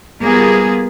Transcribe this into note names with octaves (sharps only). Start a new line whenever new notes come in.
G3 A#3 B3 F4 G#4